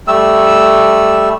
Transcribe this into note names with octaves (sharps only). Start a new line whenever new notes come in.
G3 A3 E6